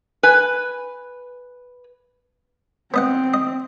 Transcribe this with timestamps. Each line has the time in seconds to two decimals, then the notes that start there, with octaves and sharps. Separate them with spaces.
0.23 B4 G#5
2.94 B3 C4 D#5 F#5
3.34 D#5